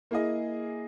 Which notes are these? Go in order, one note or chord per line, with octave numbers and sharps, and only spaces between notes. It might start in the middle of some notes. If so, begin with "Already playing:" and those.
A#3 E4 G#4 D#5